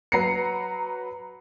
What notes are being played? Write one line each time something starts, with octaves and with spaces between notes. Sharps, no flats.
F#3 B4 A#5 A#6 C7 C#7